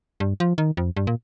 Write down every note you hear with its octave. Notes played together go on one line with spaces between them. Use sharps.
G2
F3
D#3
F2
G2
A#2